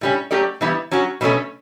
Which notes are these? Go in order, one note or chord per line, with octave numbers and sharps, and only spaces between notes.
A2 G3 C#4
F#3 A3 C#4 G4 D5
E3 G3 B3 E4
F#3 C#4 F#4
B2 F#3 A3 C#4